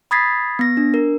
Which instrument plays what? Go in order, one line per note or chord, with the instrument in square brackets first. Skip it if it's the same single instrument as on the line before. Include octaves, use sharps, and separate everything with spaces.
[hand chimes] B5 D#6 G#6 A6 B6 C7
B3 A#6
D4
A#4